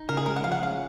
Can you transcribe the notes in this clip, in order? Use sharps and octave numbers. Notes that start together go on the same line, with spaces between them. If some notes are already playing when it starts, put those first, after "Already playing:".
Already playing: D#4
C#3 A#4
G#4
G#3 A#4
F#5
F3 F5
F#5
C#4 F5